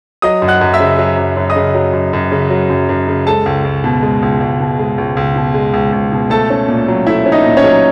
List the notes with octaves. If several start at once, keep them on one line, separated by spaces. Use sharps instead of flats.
F#3 D#5 D#6
F#2
F#5 F#6
F#2
E5 E6
C#3
F#3
F#2
F#2
D#5 D#6
C#3
F#3
F#2
F#2
C#3
F#3
F#2
F#2
C#3
G#3 A4 A5
C#2
C#2
B2
G#3
C#2
C#2
B2
G#3
C#2
C#2
B2
G#3
C#2
C#2
B2
A3 A4 A5
C#4
A#2
F#3
A3 E4 E5
C#4
D#4 D#5
A#2
C#4 C#5
F#3